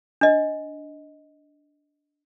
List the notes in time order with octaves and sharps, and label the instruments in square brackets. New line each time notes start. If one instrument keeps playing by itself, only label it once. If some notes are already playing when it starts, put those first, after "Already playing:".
[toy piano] D4 D#5